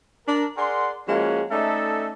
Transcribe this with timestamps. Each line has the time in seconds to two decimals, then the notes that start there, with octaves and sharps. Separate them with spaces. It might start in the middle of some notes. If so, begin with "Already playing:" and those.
0.28 D4 A#4
0.57 G#4 A#4 D5 F#5 C6
1.08 F3 G#3 A#3 C#4 F#4
1.51 A3 C#4 D#4 A4 D5 E5